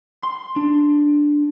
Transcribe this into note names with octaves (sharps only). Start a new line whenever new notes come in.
C6
D4